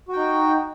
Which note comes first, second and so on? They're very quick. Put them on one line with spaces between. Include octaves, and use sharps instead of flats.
F#4 G5 D#4